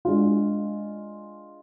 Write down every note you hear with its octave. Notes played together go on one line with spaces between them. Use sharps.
G#3 D4 F4